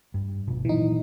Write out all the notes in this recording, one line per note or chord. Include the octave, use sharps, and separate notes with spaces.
G2
D1 G#1 B2
A#2 D#3 E3 F#3 D#4